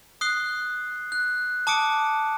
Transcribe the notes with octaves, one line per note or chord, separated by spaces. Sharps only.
D#6 F#6 C7 G7
F#6
A5 D6 D#6 C#7 D7